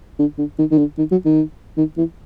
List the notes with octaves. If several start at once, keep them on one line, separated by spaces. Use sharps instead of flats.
D3
D3
D#3
D#3
D3
D#3
F#3
D#3
D#3
E3